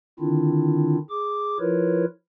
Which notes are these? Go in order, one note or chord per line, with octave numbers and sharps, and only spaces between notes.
D3 D#3 C4 D4 E4 F4
G#4 D6
F3 E4 F4 A#4 B4 C#5